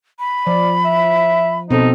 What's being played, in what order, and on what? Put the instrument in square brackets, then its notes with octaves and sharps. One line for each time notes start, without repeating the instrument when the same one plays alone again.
[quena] B5
[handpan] F3 [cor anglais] D5
[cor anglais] E5
[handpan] B2 C4 A4 [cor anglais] D#4